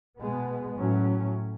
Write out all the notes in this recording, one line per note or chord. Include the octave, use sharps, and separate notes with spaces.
B2 G#3 B3
A2 F#3 C#4